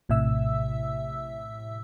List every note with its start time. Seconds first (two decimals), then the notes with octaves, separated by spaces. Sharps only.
0.09 A#1 A2 C3 E5 E6